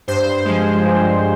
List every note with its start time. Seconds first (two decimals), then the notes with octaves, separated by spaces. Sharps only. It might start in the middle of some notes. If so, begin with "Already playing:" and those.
0.08 G2 C5
0.45 F3 G#3
0.84 G2